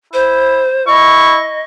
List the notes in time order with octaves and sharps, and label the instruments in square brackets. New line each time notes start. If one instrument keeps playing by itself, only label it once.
[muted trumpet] E4 [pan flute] C5
[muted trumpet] E4 [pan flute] D#5 [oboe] C#6